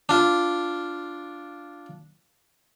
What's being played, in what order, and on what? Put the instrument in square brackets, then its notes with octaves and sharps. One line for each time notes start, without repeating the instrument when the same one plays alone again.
[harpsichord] D4 F4